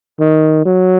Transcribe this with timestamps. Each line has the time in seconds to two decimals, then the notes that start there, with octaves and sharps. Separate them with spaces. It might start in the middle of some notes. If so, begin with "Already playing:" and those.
0.20 D#3
0.66 F#3